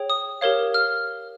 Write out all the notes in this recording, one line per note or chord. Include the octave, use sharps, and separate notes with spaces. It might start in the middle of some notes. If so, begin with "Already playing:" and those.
Already playing: G#4 C#5 G5
D#6
G4 A#4 C#5 F5
F6